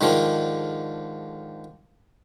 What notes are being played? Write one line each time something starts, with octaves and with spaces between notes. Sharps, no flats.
G#2 D3 D#3 F3